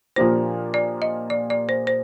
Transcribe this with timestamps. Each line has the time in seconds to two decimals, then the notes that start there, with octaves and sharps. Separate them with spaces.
0.16 A#2 F3 A#3 D4 G4 C5
0.74 D5
1.02 D#5
1.30 D5
1.50 D5
1.69 C5
1.87 C5